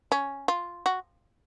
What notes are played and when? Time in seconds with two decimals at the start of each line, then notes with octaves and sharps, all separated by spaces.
0.12 C#4
0.48 F4
0.86 F#4